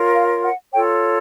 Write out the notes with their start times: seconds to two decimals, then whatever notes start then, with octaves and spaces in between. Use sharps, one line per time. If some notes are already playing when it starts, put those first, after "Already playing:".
Already playing: F4 A#4 C#5
0.15 F5
0.44 F#5
0.73 F4 A4 C#5 G5